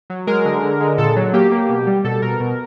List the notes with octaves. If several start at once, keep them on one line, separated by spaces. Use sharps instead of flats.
F#3
G#3 A#4
D3
D3
G#3
A#2 A4
F#3
A#3 G4
A#3
B2
G3
B2 A4
B2 A#4
B2